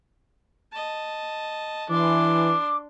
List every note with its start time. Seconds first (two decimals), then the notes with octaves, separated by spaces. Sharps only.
0.72 D#5 A5
1.90 E3 D4 C6 D6